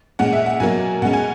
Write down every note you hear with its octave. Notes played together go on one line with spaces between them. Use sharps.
A#2 G#3 C#4 F#5
E5
F#5
B2 F#3 A#3 G#5
B2 G#3 C#4 F#5
G#5